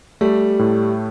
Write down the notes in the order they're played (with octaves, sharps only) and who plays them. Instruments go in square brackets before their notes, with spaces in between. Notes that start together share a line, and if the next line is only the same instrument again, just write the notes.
[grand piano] G3 [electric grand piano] A3
[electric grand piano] A2